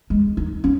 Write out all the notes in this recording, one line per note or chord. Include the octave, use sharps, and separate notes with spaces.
G#3
D#4
C#4